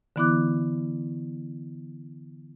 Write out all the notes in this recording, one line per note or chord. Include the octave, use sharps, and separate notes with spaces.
D3 E3 B3 E4 D6 F#6